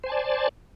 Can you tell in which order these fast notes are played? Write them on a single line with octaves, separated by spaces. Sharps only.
C5 G#5 A5 D5